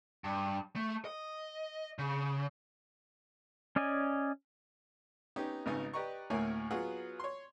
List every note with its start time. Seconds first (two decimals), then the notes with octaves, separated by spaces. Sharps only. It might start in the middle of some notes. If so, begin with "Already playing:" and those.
0.24 G2
0.76 A3
1.05 D#5
1.99 C#3
3.76 C#4 D5 D#5 G#5
5.36 B3 C#4 D#4 G4
5.66 G#1 C#3 B3 D#4 G#5
5.93 G4 B4 D5 D#5 A#5 C#6
6.30 D2 A2 A#3 A#4 C#5 G#5
6.71 F#3 B3 F4 F#4 G#4 F#5
7.20 C#5 C6